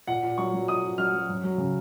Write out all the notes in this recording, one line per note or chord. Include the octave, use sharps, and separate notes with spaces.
A#2 F#5
A#2
F#3 C#6
F#3
A#2 D#6
A#2
F#3 F6
F#3
F#2
F#3
C#3